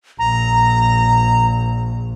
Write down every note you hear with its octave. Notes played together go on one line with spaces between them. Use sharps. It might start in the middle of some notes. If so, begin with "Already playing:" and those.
A#1 A#5